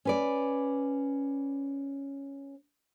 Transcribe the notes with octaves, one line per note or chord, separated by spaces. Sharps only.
C#4 B4 D5